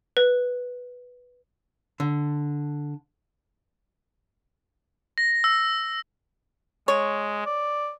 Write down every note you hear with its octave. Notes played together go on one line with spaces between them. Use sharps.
B4
D3
A#6
E6
G#3 C#5
D5